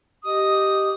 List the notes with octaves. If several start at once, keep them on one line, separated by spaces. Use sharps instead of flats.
G4 D#5 D#6